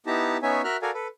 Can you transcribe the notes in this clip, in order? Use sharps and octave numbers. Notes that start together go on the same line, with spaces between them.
B3 D#4 E4 G4 A5 A#5
B3 C#4 D#4 C#5 E5 G#5
F#4 A#4 E5 F6 F#6
F#4 A4 A#4 D5 F5 G#5
A4 B4